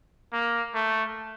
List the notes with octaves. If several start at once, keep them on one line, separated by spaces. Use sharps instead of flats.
A#3
A3